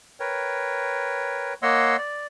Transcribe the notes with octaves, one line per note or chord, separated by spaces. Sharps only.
A#4 B4 C#5 G5
A#3 C#5 D#5 F#5 C6 E6
D5